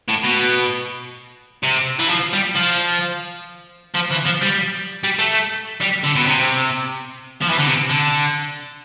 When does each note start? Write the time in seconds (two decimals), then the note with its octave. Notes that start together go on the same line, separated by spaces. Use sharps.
0.08 A2
0.24 B2
1.63 C3
1.99 E3
2.10 F3
2.33 G3
2.56 F3
3.95 F3
4.11 E3
4.25 F3
4.41 G3
5.03 G3
5.19 A3
5.81 G3
6.04 D3
6.16 B2
6.27 C3
7.42 F3
7.49 E3
7.58 D3
7.66 C3
7.90 D3